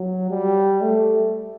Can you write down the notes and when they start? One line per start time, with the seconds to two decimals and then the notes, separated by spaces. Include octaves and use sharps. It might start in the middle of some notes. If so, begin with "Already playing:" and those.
Already playing: F#3
0.30 G3
0.81 A3